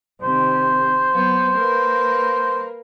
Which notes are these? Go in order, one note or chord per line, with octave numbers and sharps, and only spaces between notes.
C3 D#3 C5
F#3 B3
A#3 A#4 B4